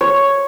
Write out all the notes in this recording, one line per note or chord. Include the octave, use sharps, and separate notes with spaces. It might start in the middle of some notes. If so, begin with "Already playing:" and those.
C#5